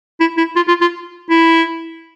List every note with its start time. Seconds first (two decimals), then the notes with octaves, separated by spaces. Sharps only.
0.20 E4
0.37 E4
0.56 F4
0.68 F4
0.81 F4
1.30 E4